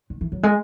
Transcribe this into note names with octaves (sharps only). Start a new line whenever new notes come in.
D#3
E3
F#3
G#3